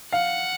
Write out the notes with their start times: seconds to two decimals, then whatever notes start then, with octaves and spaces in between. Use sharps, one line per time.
0.12 F5 F#5